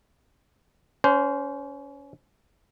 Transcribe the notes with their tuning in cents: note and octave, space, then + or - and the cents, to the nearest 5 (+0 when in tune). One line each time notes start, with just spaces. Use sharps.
C#4 +25 C5 -15